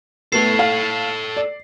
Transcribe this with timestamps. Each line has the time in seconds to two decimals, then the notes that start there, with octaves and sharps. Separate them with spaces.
0.32 A3 B3 A4 C#5 C7
0.59 F5
1.37 D5